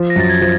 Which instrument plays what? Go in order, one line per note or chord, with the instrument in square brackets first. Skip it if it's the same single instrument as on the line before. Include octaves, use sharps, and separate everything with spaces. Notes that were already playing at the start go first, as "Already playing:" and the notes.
Already playing: [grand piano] F3
[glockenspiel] A#6
[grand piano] F#2 [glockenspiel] A6
[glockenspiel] G#6
[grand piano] F3